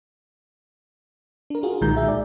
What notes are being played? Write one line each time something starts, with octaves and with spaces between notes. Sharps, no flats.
D4 A#4
F4 F#4 G#4
B1 A#2 D#3 G#3 A#5 G6
G#4 E5
D5